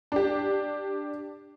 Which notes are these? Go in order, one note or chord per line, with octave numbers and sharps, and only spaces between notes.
D4 G4